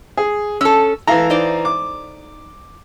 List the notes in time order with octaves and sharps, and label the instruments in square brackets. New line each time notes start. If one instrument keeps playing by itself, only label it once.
[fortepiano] G#4
[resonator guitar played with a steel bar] C#4 A4 [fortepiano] E6
[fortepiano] E3 F5 A#5 [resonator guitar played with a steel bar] A3 E4
[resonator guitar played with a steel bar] D#4 C5 D5
[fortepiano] D6